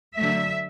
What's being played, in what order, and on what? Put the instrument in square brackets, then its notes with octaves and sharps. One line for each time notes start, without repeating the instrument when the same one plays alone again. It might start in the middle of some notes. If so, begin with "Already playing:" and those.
[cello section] D3 F#3 A3 E5